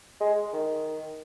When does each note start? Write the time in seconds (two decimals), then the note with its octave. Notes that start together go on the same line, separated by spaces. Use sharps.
0.21 G#3
0.53 D#3